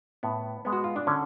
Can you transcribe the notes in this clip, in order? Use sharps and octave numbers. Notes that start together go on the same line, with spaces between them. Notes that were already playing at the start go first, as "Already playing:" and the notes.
A2 B3
G#3 B3
F#4
F4
D4
D3 C#4